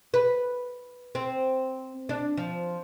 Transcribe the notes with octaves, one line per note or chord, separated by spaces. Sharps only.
B4
C4
D4
F3